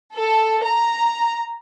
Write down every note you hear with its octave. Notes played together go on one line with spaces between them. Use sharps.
A4
A#5